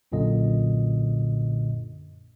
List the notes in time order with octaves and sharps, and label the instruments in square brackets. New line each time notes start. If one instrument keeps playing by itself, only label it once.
[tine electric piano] B1 F#2 A#2 D3 D#5